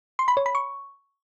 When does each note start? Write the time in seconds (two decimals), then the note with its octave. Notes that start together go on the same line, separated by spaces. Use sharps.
0.19 C6
0.28 B5
0.37 C#5
0.46 B5
0.55 C#6